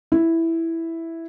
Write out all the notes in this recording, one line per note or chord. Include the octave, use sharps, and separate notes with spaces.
E4